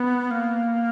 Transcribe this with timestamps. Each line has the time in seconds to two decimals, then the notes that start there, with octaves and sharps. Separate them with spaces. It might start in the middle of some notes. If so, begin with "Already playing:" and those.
Already playing: B3
0.31 A#3